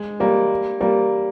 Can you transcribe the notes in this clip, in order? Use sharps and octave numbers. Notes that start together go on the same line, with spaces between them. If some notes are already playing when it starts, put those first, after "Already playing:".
Already playing: G#3
G3 A#3
G3 A#3